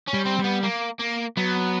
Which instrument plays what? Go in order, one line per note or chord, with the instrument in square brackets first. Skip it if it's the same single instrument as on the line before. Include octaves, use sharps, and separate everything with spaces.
[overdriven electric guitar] C#4
[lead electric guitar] G3
[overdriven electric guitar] C4
[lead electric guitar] G3
[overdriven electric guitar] B3
A#3
A#3
[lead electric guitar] F#3 [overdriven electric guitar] B3